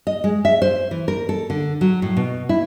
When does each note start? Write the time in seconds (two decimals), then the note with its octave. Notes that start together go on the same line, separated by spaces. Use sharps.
0.07 D#5
0.24 G#3
0.45 E5
0.62 C5
0.91 E3
1.08 A#4
1.29 A4
1.50 D3
1.81 F#3
2.02 A2
2.17 B2
2.49 E4